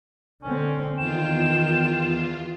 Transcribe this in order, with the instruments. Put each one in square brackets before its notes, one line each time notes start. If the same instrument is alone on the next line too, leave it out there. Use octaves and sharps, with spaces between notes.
[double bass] D3 C4 [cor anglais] C#4
[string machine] E2 F4 [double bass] D#3 [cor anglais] G5 [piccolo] E7